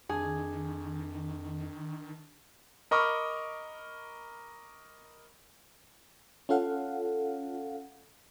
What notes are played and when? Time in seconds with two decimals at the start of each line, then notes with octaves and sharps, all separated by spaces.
0.09 F2 D#3 D4 G#4 A5
2.91 A#4 D#5 B5 C#6 D6 F6
6.49 C#4 F4 A4 F5 F#5